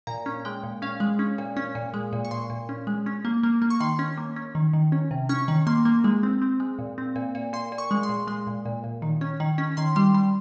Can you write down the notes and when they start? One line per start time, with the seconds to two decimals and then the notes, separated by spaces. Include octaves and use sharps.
0.07 A#2 A#5
0.26 C#4
0.45 G#3 G5
0.63 A#2
0.82 C#4 F5
1.00 G#3
1.19 C#4
1.38 A#2
1.57 C#4
1.75 A#2
1.94 G#3
2.13 A#2
2.25 C#6
2.31 A#2 C6
2.50 A#2
2.69 C#4
2.87 G#3
3.06 C#4
3.25 A#3
3.43 A#3
3.62 A#3
3.70 C#6
3.80 D#3 C6
3.99 C#4
4.18 A#3
4.36 C#4
4.55 D#3
4.73 D#3
4.92 C#4
5.11 C3
5.29 C#4 C#6
5.48 D#3
5.67 A#3 C6
5.85 A#3
6.04 G#3
6.23 C4
6.42 C4
6.60 G#3
6.79 A#2
6.98 C4
7.16 A#2
7.35 A#2
7.53 A#2 C6
7.72 A#2
7.78 C#6
7.91 G#3
8.03 C6
8.09 A#2
8.27 G#3 C6
8.47 A#2
8.65 A#2
8.84 A#2
9.02 D#3
9.21 C#4
9.40 D#3
9.58 C#4
9.77 D#3 C6
9.96 G3 C6
10.14 G3 C6